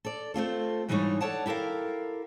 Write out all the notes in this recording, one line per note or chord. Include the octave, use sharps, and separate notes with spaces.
A4 D5
A3 C4 F4 A4
G#2 E3 G3 D4 D#4 C#5
A4 C#5 D5 F#5 A5
E4 G4 A4 A#4 F5